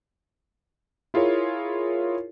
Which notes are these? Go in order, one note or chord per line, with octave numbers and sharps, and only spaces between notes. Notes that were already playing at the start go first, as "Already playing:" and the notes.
E4 F4 G#4 A#4 C#5